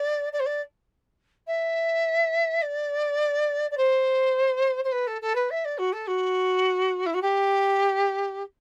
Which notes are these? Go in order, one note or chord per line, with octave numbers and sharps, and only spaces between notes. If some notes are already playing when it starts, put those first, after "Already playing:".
Already playing: D5
D5
C5
D5
E5
D5
D5
C5
C5
B4
A4
A4
B4
E5
D5
F#4
A4
F#4
E4
F#4
G4